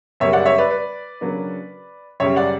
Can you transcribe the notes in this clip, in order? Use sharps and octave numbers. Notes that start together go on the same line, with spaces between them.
F#2 C#3 G3 A#3 C#5 E5
D5 F#5
C#5 E5
B4 D5
B4 D5
C#3 F#3 A#3 D4
F#2 C#3 G3 C#5 E5
D5 F#5